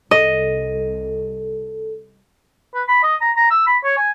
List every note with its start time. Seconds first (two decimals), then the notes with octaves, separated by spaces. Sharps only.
0.11 C2 A4 D#5
2.74 B4
2.88 B5
3.03 D#5
3.21 A#5
3.37 A#5
3.50 E6
3.67 B5
3.84 C#5
3.97 G#5